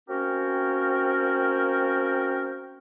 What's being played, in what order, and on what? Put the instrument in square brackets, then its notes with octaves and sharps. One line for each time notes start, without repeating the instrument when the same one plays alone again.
[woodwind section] A#3 C4 C#4 F#4 A#4 G5